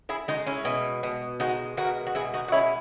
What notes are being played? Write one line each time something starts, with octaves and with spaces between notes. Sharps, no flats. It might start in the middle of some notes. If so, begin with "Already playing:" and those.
E4 G#4
G#3 D#4 F#4
C#4 E4
B2
B2
G#3 D#4 F#4
B2 F#4 A#4
F#4
B2 E4 G#4
D#4 F#4
F#4
G#3 C#4 E4